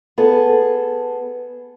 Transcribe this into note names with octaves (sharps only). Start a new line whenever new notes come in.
B3 G#4 A4